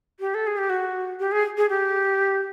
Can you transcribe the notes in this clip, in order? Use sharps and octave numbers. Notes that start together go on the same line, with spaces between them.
G4
A4
G#4
G4
F#4
G4
G#4
G#4
G4